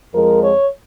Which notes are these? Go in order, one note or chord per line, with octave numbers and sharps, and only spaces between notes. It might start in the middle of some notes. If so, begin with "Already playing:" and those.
F2 F3 G#3 A#4
C#5